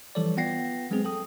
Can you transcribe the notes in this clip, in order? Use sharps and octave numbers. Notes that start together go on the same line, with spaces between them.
E3 F3 G3 A4 C#5 D5
B3 F4 F#5 G5 A#6 C7
F#3 G#3 B3 C4 G#4
A4 G5 D#6